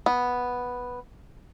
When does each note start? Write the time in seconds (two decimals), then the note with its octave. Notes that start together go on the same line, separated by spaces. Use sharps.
0.06 B3